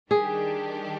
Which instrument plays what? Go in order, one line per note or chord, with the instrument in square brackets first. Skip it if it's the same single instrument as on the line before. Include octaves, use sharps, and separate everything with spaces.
[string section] D#3 G3 D4 G4 [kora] G#4